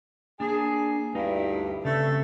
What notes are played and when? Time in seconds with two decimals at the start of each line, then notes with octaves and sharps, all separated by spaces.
0.40 A#3 D4 G#4
1.15 D2 G2 D#4 E4
1.85 C#3 A3 C4 E5